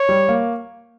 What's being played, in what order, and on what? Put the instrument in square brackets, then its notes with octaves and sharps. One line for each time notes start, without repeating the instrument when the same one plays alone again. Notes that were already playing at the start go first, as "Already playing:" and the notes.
Already playing: [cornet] C#5
[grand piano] G3
A#3